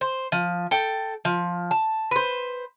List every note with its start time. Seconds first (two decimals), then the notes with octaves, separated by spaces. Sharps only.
0.01 C5
0.32 F3
0.71 A4 G5
1.25 F3
1.71 A5
2.11 B4 C5